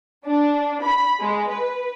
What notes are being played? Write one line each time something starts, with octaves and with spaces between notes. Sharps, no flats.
D4
B5
G#3
B4